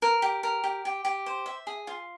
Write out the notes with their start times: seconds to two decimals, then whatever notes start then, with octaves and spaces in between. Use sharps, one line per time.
0.02 A#4
0.22 G4
0.43 A#4
0.64 G4
0.85 G4
1.05 G4
1.26 C5
1.46 E5
1.67 G#4
1.87 F4